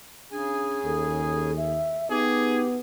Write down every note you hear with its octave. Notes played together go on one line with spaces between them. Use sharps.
C#3 D4 G#4 G#5
D#2 A4
E5
B3 D#4 G4 G#4